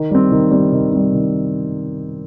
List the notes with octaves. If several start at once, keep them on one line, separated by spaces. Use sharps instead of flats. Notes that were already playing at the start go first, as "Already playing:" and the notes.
Already playing: D#3
G3 C4
D#3
G3 C4
D#3
G3 C4
D#3